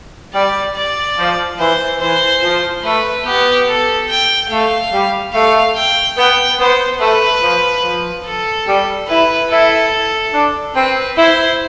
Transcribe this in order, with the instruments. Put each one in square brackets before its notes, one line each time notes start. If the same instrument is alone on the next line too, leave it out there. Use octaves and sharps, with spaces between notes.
[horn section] G3 [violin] D5
[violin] D5
[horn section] F3
[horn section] E3 [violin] C5
[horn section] E3 [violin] C5
[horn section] F3
[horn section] A3 [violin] B4
[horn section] B3 [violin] G4
[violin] A4
G5
[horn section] A3 [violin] F5
[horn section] G3
[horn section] A3 [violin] F5
[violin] G5
[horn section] B3 [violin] G5
[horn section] B3 [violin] C5
[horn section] A3 [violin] B4
[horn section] F3
F3
[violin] A4
[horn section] G3
[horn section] E4 [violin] B4
[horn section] E4 [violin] A4
[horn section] D4
[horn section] C4 [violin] B4
[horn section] E4 [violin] C5